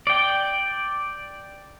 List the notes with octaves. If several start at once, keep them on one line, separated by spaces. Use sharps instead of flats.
D5 G5